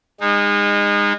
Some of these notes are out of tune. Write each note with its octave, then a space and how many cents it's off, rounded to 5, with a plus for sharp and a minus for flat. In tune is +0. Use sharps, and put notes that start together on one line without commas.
G#3 -30 D#4 -25